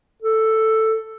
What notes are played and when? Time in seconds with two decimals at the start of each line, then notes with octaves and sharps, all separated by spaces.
0.23 A4